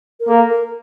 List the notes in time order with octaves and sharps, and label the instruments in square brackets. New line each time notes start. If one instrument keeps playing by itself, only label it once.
[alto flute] A#4
[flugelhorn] A#3 [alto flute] A4
[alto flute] A#4